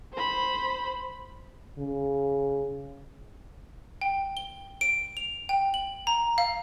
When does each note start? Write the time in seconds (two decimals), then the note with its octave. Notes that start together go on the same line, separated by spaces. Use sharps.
0.13 C5 B5
1.78 C#3
4.01 G5
4.37 G7
4.81 D7
5.17 F7
5.49 G5
5.74 F#7
6.07 A#5
6.38 F5